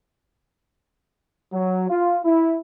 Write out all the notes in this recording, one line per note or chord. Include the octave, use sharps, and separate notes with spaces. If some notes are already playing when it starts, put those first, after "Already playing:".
F#3
F4
E4